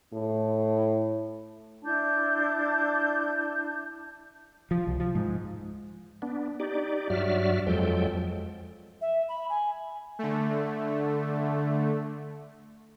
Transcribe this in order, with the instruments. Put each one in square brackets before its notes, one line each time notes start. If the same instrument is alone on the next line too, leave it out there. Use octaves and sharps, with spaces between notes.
[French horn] A2
[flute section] D4 E4 A5 G6
[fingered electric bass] F3
C2
F3
G#2
[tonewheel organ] B3 D4
D#4 G4 D5
G2 F#3 F#4 D5 E5 F6
F2 F3 F#3 G#3 A4 G5
[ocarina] E5
B5
G#5
[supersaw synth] D3 A3